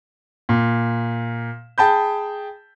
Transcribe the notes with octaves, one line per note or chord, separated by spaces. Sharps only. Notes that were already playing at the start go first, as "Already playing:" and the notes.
A#2
G#4 G5 A5 B5 G6